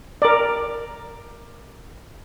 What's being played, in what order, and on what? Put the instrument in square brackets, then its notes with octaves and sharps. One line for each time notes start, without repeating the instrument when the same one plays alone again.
[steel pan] A#4 D5